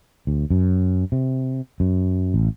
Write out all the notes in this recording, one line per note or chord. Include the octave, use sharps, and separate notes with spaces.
D2
F#2
C3
F#2
A1